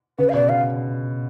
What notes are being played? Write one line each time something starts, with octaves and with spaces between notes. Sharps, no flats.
C#3 B4
F5
B2 D5
B2 F5